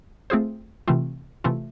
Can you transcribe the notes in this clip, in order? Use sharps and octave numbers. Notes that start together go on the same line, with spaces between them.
A3 C4 F4 G#4 C5
C3 E3 A3 C4 F4
C3 E3 A3 C4 F4